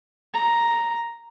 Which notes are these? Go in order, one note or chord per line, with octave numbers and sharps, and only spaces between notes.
A#5